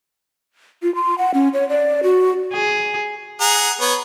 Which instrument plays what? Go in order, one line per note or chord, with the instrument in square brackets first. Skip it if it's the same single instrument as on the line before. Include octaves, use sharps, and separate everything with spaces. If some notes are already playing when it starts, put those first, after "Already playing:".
[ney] F4
C6
F#5
C#4
C#5
D5
F#4
[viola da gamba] G#4
[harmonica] G#4 F#5 A#5
B3 C#5